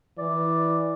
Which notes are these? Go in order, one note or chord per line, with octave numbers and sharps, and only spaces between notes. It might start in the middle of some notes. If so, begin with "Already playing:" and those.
E3 D5